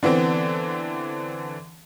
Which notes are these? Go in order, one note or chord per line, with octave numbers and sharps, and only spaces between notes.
D3 E3 B3 C4